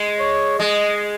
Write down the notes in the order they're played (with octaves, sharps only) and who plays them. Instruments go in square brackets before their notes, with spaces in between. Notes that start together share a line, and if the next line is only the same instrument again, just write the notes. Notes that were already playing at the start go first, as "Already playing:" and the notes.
Already playing: [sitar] G#3
[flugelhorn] C#5
[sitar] G#3 [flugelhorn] D#5